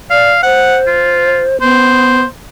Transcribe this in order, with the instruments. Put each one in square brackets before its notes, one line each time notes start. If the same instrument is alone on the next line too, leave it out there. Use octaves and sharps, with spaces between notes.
[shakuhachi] D5 [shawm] F5
[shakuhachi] C5 [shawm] F#5
[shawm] F4
[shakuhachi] B3 [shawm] C5